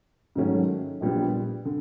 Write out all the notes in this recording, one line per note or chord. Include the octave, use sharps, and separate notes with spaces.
G#2 D#3 F#3 A3 C#4
A#1 A#2 G3 B3
D3